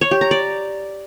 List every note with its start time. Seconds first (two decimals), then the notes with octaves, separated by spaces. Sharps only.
0.01 C#5
0.11 G4
0.21 A#5
0.31 D5